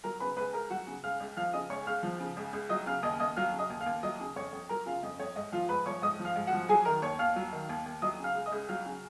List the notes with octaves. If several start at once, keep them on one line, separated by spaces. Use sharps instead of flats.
F#3 A#4 A#5
C#3 B4 B5
C#2 B4 B5
C#2 A#4 A#5
F#3 F#4 F#5
C#3
C#2 F5 F6
C#2
F3 F5 F6
C#3 D#5 D#6
C#2 C#5 C#6
C#2 F5 F6
F3
C#3
C#2
C#2
F#3 D#5 D#6
C#3 F5 F6
D#2 D#5 D#6
D#2 D#5 D#6
F#3 F5 F6
C#3
D#5 D#6
D#2
F5 F6
D#2
F#3 D#5 D#6
C#3
F2 C#5 C#6
F2
F#3 A#4 A#5
C#3 F4 F5
F2 D#5
F2 C#5
G#2 D#5
F3 F4 F5
G#2 B4 B5
F3 C#5 C#6
G#2 D#5 D#6
F3
F5 F6
G#2
F#4 F#5
F3
F#3 G#4 G#5
D#3 A#4 A#5
D#2 C#5 C#6
D#2 F5 F6
F#3
D#3
D#2
D#2
F#3 D#5 D#6
C#3
F5 F6
C#2
D#5 D#6
C#2
F#3 F5 F6
C#3